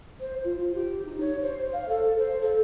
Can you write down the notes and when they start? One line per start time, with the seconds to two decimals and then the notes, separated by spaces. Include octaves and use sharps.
0.20 C5
0.44 F4
0.59 F4
0.75 G4
1.05 D#4
1.21 C#5
1.42 C5
1.73 F5
1.89 A4
2.18 C5
2.42 A4